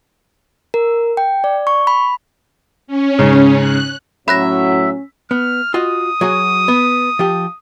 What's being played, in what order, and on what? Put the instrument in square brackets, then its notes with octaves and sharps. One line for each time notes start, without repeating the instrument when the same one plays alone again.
[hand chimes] A#4
G5
D5
C#6
B5
[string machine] C#4
[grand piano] G#2 C#3
[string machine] F#6
[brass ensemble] A2 F#3 [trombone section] C#4 [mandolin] E5 [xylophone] B5 F#6 A#6
[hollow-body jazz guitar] B3 [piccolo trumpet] F6
[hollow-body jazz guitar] F4 F#4 D#5 [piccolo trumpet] D#6
[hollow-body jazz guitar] F#3 F#4 G#4
B3
F3 G4